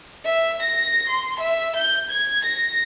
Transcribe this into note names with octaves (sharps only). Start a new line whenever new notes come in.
E5
A#6
C6
E5
G6
G#6
A#6